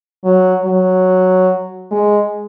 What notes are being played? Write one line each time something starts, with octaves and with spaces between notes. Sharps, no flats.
F#3
F#3
G#3